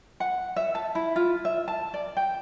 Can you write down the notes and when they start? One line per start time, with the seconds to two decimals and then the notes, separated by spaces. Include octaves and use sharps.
0.20 F#5
0.56 E5
0.75 A5
0.95 E4
1.16 F4
1.45 E5
1.68 A5
1.94 D5
2.17 G5